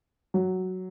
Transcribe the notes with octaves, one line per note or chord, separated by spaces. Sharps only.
F#3